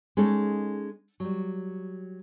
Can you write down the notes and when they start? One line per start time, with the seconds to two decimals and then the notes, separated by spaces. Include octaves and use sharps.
0.17 G#3 C#4 D#4 A4
1.20 F#3 G3